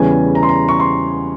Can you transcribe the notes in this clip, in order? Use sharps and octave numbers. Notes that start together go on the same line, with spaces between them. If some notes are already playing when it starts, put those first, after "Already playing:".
Already playing: E2 C#3 E3 G3 C#4 G#5
A#5
C6
A#5
C#6
C6